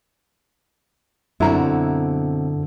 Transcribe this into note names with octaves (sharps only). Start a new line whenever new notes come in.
F#2 B2 D3 C4 E4 F#4 A#5